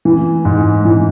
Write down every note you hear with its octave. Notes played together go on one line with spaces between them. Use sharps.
E3
G#2
E3